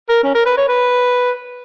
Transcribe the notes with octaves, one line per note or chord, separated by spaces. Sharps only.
A#4
C#4
A#4
B4
C#5
B4